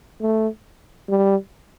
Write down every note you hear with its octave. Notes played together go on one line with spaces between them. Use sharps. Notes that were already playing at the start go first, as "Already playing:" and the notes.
A3
G3